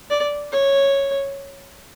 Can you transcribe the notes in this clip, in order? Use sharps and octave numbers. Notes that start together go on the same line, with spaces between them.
D5
C#5